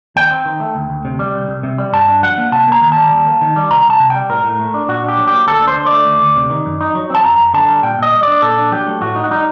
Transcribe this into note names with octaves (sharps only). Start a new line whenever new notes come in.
D#2 G5
C4
D#3
A3
D2
D2
C3
G3
C2
C2
C3
G3
G2 A5
D4
F#3 F#5
A#3
C3 A5
A#3 A#5
D#3
G3 A5
D#2
A#3
D#3
G3
C2 A#5
C2
A5
C3
G3 G5
A2 A#4
A2
A3
D4
A#2 F#4
D4 G4
F#3
G4
A#3
D2 A4
D4
C5
D3
D5
A3
D2
D2
C3
D#3
F#2
D#4
F#3
C4 A5
F#2 A#5
F#2
D3 A5
G3
A#2 G5
A#2 D#5
G3
D4 D5
A#2 A4
D4
F#3 G4
A3
A2 F#4
D#4
F#4
G3 D#4